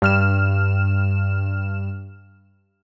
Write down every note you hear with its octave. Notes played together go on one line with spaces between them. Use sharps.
G2 F6 E7